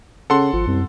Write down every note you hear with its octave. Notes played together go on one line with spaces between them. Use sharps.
C#3 A4 F#5 C6
G#1 F3
C2 F#2